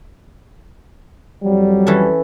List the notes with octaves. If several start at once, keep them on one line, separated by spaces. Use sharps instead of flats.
F2 F#3 G3
E3 C#4 A4